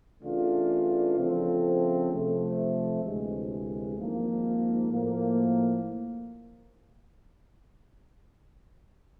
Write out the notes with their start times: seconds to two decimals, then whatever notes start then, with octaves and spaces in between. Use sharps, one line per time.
0.23 C#3 E3 A3 D4 F4
1.16 C#3 F3 A3 C4 F4
2.10 C3 F3 A3
3.03 D2 C3 E3 G#3
3.97 G#1 G#2 F3 A#3
4.90 A2 F3 A#3